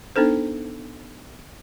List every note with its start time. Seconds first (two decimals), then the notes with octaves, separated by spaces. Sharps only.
0.16 B3 D4 D#4 A4 C5